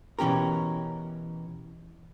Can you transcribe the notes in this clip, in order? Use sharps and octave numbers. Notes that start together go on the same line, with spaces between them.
B2 E3 C#4 G4 A#4